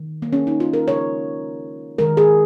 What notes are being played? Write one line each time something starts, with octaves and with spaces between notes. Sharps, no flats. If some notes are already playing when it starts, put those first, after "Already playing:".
Already playing: D#3
A#3
C#4
D#4
F4
A#4
C#3 F3 G#3 C#5
D#3 G#3 A#4
G#4